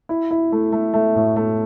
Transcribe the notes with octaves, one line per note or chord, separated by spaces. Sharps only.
E4
E4
A3
A3
A3
A2
A3